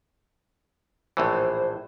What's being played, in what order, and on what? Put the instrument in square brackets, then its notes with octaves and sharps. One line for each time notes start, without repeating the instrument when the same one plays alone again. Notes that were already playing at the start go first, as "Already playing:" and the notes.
[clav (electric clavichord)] A#1 A2 E3 [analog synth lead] C5